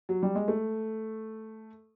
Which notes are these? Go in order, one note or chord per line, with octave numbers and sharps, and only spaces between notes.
F#3
G3
G#3
A3